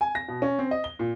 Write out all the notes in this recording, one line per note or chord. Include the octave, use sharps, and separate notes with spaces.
G#5
A#6
B2
C#4
C4
D#5
G7
A#2